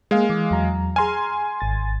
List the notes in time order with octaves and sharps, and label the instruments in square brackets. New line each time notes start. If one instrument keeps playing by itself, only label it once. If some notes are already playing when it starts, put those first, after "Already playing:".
[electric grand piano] G#3 F5 [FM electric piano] A#3 G#4
[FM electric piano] E3 D6
E2 F#3 A#5
[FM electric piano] G#4 A#5 F6 [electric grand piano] G#5 C6
[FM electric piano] G#1 A6